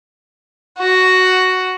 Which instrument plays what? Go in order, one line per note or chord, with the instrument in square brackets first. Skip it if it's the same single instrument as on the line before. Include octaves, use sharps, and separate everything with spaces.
[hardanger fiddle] F#4